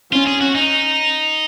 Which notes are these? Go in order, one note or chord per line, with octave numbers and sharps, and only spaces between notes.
C#4 F4
G#4
F#4
D#4